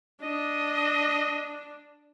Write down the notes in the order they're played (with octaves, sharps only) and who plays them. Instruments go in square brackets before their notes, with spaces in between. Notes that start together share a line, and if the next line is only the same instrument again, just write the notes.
[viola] D4 [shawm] D#5